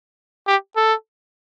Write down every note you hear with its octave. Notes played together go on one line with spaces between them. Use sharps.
G4
A4